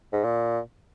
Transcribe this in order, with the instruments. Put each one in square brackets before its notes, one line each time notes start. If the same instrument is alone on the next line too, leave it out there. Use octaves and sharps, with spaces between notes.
[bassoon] G#2
A#2